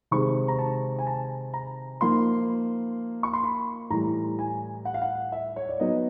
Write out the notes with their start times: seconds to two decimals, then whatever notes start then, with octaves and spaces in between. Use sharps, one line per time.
0.11 C3 D#3 G#3 C4 C#6
0.48 A#5
0.59 A5
0.99 G#5
1.07 A5
1.54 A#5
2.01 F3 A#3 D#4 C6
3.23 C#6
3.33 C6
3.43 B5
3.90 A2 E3 G3 A#5
4.39 G#5
4.85 F#5
4.94 F5
5.02 F#5
5.32 E5
5.56 C#5
5.69 D5
5.80 F#3 B3 D#4 D#5